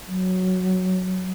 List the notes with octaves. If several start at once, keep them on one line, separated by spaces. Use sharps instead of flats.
F#3